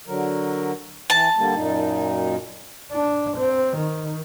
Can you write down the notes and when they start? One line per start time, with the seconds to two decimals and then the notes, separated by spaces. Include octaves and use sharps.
0.08 D3 F#3 A#4
1.10 E3 A5
1.38 D3 G3 A#3
1.55 F#2 A#2 D#4
2.92 D4
3.37 C4
3.77 D#3